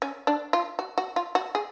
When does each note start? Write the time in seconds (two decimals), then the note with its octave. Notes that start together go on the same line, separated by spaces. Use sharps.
0.02 C#4
0.27 D4
0.53 F4
0.79 F#4
0.98 F#4
1.16 F4
1.35 F#4
1.55 G#4